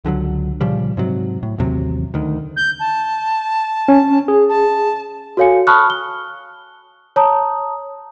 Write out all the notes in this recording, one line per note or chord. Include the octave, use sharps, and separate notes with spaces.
C#2 D3 F3 F#3
A#2 C#3 F3 G3
G#2 C3 F#3
A2
A1 D#2 C3 F#3
D2 D#3
G6
A5
C#4
G#4
A5
F#4 A4 C#5 F5 G#5 C#7
A5 B5 C#6 D#6 F6 F#6
G7
C#5 A5 A#5 D#6